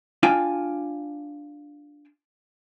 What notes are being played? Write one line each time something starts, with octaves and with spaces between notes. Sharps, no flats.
D4 F4 G5 G#5